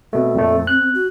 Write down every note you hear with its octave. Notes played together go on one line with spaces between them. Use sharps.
B2 A3 C4
F2 A#2 A3
F#6
F#4